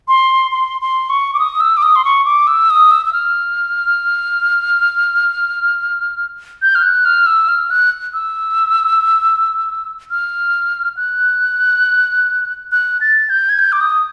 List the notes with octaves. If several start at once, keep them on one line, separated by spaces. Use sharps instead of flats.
C6
C6
C6
C#6
D6
D#6
E6
D6
D#6
C6
C#6
D6
E6
D#6
E6
E6
F6
G6
F6
F#6
F6
E6
F6
F#6
E6
F6
F#6
F#6
A6
G6
G#6
G6
D6
D#6